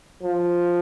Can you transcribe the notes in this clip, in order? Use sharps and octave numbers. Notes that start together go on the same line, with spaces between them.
F3